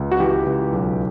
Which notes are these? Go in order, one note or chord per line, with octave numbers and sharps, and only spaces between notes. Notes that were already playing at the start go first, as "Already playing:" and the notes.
Already playing: C#2
F#4
E3 G4
C#2
B1